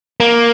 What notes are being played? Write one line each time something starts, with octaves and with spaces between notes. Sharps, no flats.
A#3